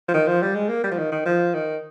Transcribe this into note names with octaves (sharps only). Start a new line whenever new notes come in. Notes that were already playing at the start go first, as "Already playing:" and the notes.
F3
D#3
F3
G3
G#3
A#3
G3
F3
D#3
D#3
F3
D#3